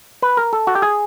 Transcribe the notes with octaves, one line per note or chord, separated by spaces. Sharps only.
B4
A#4
A4
F#4
G4
G#4